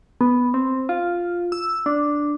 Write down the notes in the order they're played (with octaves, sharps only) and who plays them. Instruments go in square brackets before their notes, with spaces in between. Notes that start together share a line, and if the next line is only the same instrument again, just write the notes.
[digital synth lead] B3
C4
F4
E6
D4